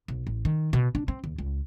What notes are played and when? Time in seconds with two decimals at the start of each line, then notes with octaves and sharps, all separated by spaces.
0.08 B1
0.27 A1
0.45 D#3
0.73 B2
0.95 D4
1.08 C4
1.24 D#2
1.38 C#2